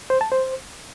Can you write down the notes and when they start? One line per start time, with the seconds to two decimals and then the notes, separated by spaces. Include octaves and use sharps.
0.10 C5
0.21 A5
0.32 C5